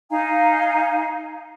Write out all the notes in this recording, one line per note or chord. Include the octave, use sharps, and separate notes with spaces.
D#4 F5 G#5 A#5